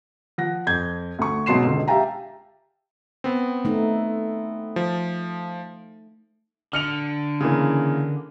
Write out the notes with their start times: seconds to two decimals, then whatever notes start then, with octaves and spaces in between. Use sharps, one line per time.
0.38 F3 F#5 A#6
0.67 F2 G6 G#6
1.19 D2 C#6
1.46 G#2 B2 F#3 C6 C7 E7
1.65 C#2 D3
1.88 G4 E5 F5 G5 A5 A#5
3.24 B3 C4
3.65 A3 D#4
4.76 F3
6.73 D3 F6 C#7 F7
7.40 C#3 E3 A#3